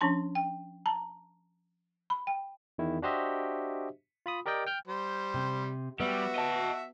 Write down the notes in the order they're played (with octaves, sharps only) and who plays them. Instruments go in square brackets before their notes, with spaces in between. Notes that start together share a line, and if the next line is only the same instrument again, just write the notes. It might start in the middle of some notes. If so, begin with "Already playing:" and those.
[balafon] F3 C#4 D4 A5 C6
G5
A5 A#5
B5
G5
[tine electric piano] E2 D#3 E4
D4 F#4 G4 C5 D#5 E5
F4 B5 D#6
G4 A#4 D5 D#5 G5
G5 F6 G6
[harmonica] G3 C5
[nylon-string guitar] C3
[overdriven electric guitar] G3 [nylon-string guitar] B3 [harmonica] F#4 E5
[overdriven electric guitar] D#5 A5